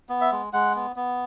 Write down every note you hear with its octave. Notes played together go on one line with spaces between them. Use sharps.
B3
E5
G#3
G#3 F#5
B3
B3